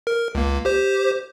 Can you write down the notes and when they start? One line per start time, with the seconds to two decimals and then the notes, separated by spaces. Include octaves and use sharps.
0.07 A#4
0.35 C#2 A#3
0.65 G4 C5